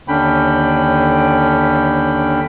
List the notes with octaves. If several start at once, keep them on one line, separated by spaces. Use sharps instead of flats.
D#2 D3 C#4 D4 G5 B5